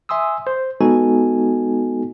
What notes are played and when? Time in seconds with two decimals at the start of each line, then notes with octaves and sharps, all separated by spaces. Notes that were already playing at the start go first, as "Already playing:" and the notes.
0.09 E5 G#5 C6 D#6 E6
0.47 C5
0.81 G#3 B3 D#4 F#4 A4 G#5